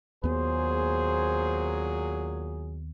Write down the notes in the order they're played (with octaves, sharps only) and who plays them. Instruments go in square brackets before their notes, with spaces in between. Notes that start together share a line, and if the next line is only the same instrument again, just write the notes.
[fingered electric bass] D#2 B3 [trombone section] A#2 F#3 G#4 [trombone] C5